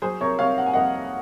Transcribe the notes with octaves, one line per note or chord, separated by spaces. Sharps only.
F#3 G#4 C5
C3 A#4 C#5
C3 C#5 F5
A#3 F#5
G#5
F2 D#5 F#5
A#3